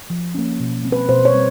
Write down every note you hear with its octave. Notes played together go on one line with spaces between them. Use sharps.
F3
A#3 C#4
B2
G3 C4
B4
B2 C5
C#5
G3 C4